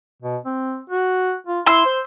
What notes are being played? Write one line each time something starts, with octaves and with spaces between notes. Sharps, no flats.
B2
C4
F#4
F4
E4 C6 E6
C5